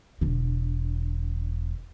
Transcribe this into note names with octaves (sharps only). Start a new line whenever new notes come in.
E1 D3